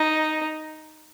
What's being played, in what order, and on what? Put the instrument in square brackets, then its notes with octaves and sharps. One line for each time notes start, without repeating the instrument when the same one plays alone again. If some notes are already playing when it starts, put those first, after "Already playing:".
Already playing: [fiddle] D#4